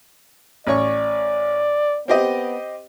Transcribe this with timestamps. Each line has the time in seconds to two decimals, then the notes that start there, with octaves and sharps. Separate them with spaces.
0.67 A1 C#5 D5 C#6
2.08 B3 C4 G4 D#5